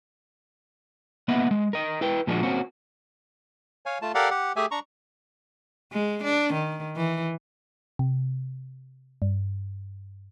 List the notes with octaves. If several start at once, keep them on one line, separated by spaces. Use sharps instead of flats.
A#3 B3 D#5 E5 F#5
G#3
A#4 D#5
E4 B4 G5
A#2 F3 G#3 A#3 D4 F#4
A#3 C4 C#4 F#4
C#5 F5 G#5
A3 F4 A5
G4 A4 A#4 D5 F5 F#5
G4 F#5
A3 G4 G#4 E5 G#5
D4 A#5 C#6
G#3
D4
D#3
E3
C3
G2